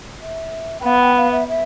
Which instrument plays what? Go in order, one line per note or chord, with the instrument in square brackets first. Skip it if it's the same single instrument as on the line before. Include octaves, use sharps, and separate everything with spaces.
[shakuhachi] E5
G5
[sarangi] B3 [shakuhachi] F5
[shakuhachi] G5
F5
E5
E5